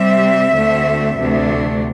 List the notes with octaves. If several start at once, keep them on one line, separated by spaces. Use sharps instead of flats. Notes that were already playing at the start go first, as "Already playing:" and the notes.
Already playing: C3 G3 C4 E5
D2 D3 A3 C4
D2 C3 E3 A3 D4